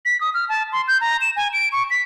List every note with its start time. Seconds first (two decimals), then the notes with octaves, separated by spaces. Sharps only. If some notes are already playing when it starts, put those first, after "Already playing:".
0.05 B6
0.21 D#6
0.34 F6
0.49 A5
0.72 C6
0.88 G6
1.01 A#5
1.21 E7
1.36 G#5
1.53 D7
1.72 C#6
1.90 B6